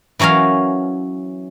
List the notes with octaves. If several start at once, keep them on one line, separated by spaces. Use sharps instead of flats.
E3 F#3 C#4 A#4 F5